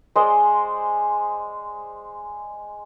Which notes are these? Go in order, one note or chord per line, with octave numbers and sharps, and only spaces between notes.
G#3 C5 D5 D#5